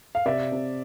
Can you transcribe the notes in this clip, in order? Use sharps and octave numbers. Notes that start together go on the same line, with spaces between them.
F5
C3 D5 E5
C3